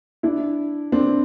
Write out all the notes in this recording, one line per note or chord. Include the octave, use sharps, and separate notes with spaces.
D4 E4
C4 D4